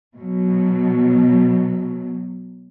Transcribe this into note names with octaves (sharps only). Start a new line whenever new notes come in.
B2 F#3